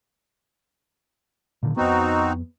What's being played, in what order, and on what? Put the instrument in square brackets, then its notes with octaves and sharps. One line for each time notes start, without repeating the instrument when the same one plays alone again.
[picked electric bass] A#2 D3 D#3
[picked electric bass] F2 B3 [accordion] C4 D#4 F#4